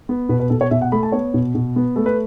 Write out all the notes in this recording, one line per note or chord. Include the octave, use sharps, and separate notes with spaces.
B3
B2 B4
B4
B2 A4
C#5
B2 E5
F#5
A3 B5
A5
B3 C#5
B2
B2
B3
A3 A4
B4